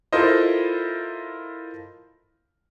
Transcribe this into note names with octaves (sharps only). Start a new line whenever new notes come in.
E4 F4 A4 A#4 C5 D#5